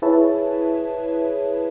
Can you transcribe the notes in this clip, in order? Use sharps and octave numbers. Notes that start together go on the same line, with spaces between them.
E4 G#4 B4 C#5 E5 A5